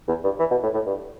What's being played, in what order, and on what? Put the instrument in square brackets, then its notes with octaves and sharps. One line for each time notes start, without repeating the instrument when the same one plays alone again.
[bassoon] E2
G2
E3
B2
A2
A2
G2